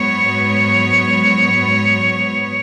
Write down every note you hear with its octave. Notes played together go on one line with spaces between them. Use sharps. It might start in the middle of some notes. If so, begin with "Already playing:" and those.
Already playing: G#2 F#3 B3 C#5